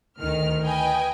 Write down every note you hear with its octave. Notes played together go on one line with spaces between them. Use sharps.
D2 D#3 F6
B4 D#5 G5 G#5